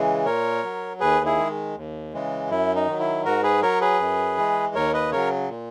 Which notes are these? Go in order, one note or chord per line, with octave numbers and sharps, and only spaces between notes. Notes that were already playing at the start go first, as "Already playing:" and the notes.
Already playing: C#3 E3 G#3
A#2 A#4 C#5
F#3
D#2 G#4 B4
E4 G#4
D#3 G#3
D#2
C#3 E3 G#3
F#2 E4
D#4
D#3 F#3
E4
G#2 F#4 A#4
G#4 B4
F#3 A#4 C#5
G#4 B4
F#2
E3 G#3
D#2 A#4 C#5
B4 D#5
C#3 F#3 A#4 C#5
A#2